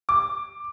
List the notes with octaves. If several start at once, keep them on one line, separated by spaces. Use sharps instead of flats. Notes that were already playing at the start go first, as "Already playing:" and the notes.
D6